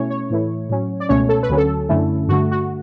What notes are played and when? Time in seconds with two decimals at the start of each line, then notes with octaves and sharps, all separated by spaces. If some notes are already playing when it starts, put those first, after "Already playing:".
Already playing: B2 A3 C#4 E4 C#5
0.10 C#5
0.30 A2 E3 A3 E4
0.70 A2 F#3 C#4
1.00 D5
1.09 C#2 B2 A3 C#4 C#5
1.29 A4
1.43 B4
1.49 D2 D3 F#3 C#4
1.57 A4
1.89 F#2 D3 A3 C#4 E4
2.28 G2 D3 A3 F#4
2.51 F#4